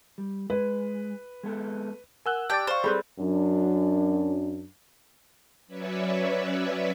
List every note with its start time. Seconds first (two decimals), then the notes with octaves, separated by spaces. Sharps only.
0.18 G3
0.50 G#3 B4
1.43 G#3 B3 A4
2.26 A#4 F#5 G#5 E6 F#6 G7
2.50 G4 D5 G5 A5 D6 A6
2.67 C5 D5 F5 C#6 F6
2.84 G3 C4 G#4 A4 B4
3.19 F#2 D4
5.67 F#3 C#4 B4 C#5 D5 E5